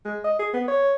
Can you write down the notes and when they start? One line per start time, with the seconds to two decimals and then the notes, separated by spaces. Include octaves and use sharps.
0.05 G#3
0.24 D#5
0.39 G#4
0.54 B3
0.68 C#5